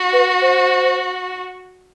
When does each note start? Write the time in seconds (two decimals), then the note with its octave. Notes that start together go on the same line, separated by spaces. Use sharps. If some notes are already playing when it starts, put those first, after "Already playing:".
Already playing: F#4
0.13 B4
0.42 C5